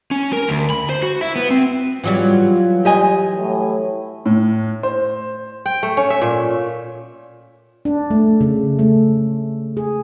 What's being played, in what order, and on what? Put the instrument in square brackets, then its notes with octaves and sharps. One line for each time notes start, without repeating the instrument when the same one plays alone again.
[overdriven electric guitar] C#4
A#4
D2
B5
C5
F#4
E4
B3
C4
[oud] E3 F#3 G3 [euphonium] F4
[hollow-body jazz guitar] G4 D#5 G#5
[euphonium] A2
[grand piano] A2
C5
[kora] G5
A3
C#4
E5
A#2
[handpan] D4
A3
C#3
A3
G#4